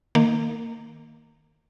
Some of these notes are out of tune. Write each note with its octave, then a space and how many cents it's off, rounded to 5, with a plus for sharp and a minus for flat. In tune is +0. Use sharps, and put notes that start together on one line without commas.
D#3 +0 A#3 -20